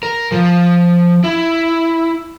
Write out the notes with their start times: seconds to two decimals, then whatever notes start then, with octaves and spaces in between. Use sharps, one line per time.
0.03 A#4
0.32 F3
1.24 E4